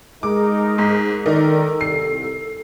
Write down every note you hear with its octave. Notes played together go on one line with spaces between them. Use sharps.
G#3 D#4 G#4 A#4 D6
G#2
D#3 D#4 A4 A#4 D5
C2 C7